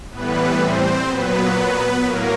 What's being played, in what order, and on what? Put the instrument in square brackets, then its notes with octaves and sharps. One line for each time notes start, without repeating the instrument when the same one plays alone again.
[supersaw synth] A2 E3 G3 B3 B4
C4 C5
A#2 F#3 B3 B4
A2 F#3 A#3 A#4